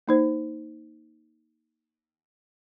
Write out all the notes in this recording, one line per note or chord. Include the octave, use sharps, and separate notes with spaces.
A#3 D#4 C5